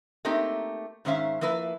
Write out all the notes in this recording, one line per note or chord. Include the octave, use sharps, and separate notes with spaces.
A3 A#3 C4 D#4 G4
G#2 D#3 C#4 C5 E5 F5
F3 A#3 E4 B4